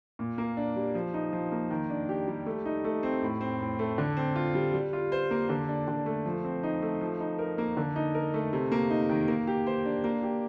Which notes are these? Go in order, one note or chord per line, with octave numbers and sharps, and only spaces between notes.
A#2
A#3
D4
G3
F3
D#4
F3
A#3
D#3
D4
G4
G3
A3
D#4
A3
C4
A2
C4
A2
A3
D3
C4
F4
G3
G3
F4
C5
A#3
D3
D4
D3
A3
F3
C4
D#4
A3
F3
D#4
A#4
A#3
D3
D#4
A#4
A3
C3
A#3
D#4
D#3
A#3
G4
C5
D4
A#3
G4